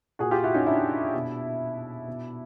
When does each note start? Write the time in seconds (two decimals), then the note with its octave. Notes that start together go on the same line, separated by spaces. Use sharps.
0.19 A#2 F#4 G#4
0.31 F4 G4
0.44 E4 F#4
0.54 C#4 D#4
0.67 D4 E4
1.14 B2
2.08 B2